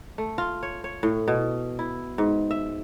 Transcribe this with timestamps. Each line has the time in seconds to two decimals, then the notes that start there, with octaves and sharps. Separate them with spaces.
0.18 A3
0.38 F4
0.63 C#5
0.84 C#5
1.03 A2
1.28 B2
1.79 E4
2.18 G#2
2.51 E5